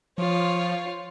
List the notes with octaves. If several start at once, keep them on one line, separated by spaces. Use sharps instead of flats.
F3 F4 C#5